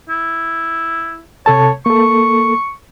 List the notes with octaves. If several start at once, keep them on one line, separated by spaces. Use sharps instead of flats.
E4
C3 A4 C#5 A5
A#3 A4 C#6